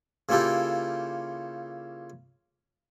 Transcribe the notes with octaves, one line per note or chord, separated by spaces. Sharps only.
C#3 A#3 E4 F4 G4 A4